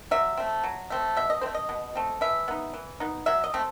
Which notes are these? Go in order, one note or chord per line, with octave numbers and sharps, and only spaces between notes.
F#3 E5
A3 C4
F#3
A3 C4
B2 E5
D#5
A3 C4 C5
D#5
B2
A3 C4
E3 E5
B3 D#4
E3
B3 D#4
F#3 E5
D#5
A3 C4